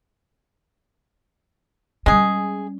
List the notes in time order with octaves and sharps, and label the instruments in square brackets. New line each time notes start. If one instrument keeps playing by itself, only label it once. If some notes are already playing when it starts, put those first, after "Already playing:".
[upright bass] G3 C#4 [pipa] G#3 G#4